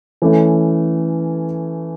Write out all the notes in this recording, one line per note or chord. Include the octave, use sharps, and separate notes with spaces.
E3 A3 C#4